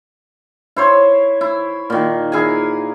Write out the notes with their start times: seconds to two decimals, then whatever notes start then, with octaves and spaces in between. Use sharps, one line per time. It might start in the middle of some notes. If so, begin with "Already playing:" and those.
0.76 E4 C5 C#5
1.41 E4
1.90 A#2 D#3
2.32 E4 G#4 A#4 G#5